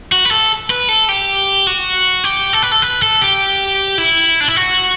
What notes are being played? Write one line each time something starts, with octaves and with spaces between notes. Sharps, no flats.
F#4
B4
A4
B4
A4
G4
F#4
G4
A4
B4
A4
B4
A4
G4
E4
D4
E4
F#4